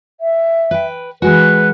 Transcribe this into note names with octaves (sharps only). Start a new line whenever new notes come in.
E5
B4 G5
E3 G#3 F#4 B4